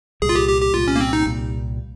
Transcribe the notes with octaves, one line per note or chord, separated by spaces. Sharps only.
C2 A#2 G3 G#4
F4
G4
G4
G4
C2 A#2 G3 F4
C#4
A#3
C4
D#4
C2 A#2 G3